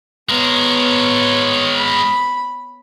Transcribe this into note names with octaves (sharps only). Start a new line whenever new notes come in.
G#3 B3 A#4 C#5
B5